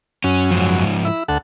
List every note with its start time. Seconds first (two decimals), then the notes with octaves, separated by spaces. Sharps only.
0.24 F#2 C#4
0.51 G#2 F3
1.05 E4
1.28 D2 A4 F#5